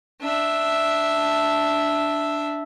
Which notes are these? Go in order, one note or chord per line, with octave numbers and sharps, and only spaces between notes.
D4 E5